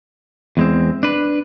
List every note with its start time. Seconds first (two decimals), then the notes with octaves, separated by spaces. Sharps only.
0.57 E2 G#3 C4
1.03 D4 B4